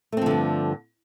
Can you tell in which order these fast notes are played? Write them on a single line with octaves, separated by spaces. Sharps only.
A3 C4 F3 D3 G2